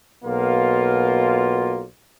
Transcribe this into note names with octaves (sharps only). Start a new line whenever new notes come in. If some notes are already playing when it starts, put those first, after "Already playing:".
B1 B2 A#3 F4